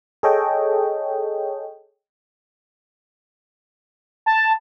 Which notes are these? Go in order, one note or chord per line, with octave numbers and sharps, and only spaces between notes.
G#4 A4 C#5 D#5 G5
A5